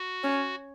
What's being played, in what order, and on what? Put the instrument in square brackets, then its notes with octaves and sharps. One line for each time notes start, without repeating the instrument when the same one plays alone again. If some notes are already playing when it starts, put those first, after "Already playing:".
Already playing: [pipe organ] F#4
[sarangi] C#4